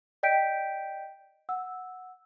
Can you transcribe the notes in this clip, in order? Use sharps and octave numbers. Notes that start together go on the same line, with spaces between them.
D5 D#5 G5 G6 B6 D7
F#5 E6